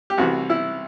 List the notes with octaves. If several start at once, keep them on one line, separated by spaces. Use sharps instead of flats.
G4
C2 C3 E3 F#4
E4